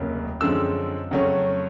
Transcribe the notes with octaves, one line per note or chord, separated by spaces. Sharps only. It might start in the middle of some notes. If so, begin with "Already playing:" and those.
Already playing: F1 D#2 C#3 F#3 A#3
F#2 D3 F3 G#3 C4 E6
F2 C#3 F#3 A3 C#4